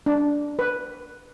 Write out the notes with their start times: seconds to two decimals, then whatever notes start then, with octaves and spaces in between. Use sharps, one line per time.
0.06 D4
0.59 B4